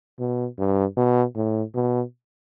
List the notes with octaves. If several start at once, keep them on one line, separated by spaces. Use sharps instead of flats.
B2
G2
B2
A2
B2